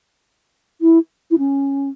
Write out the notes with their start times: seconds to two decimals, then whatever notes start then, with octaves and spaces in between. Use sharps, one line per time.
0.81 E4
1.31 E4
1.38 C#4